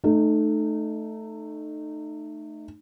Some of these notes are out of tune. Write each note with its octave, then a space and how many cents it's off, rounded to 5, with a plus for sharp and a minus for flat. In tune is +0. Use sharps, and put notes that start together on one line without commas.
A3 +0 D#4 -25